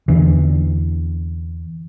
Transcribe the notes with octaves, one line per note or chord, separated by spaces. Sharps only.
E2 D3 E3